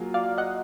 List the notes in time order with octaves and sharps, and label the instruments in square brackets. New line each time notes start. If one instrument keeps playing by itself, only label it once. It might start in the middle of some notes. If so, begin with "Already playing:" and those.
Already playing: [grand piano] F#3 A#3 F4 G#4
[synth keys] D5 F5
D#5 F#5